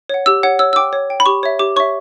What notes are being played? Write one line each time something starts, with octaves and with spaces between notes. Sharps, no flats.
C#5 F#5
G4 E6
C#5 F#5
C#5 E6
E6
G5 D6
C#5
G5
B5
G4 C#6
C#5 E5
G4 D6
C#5 E5 C#6